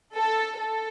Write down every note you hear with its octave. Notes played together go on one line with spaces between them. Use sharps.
A4
A4